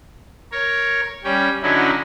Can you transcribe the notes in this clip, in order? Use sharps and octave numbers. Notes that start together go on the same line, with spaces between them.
A#4 C#5
G3 C#4 G5
D3 F#3 C#4 D#4 E4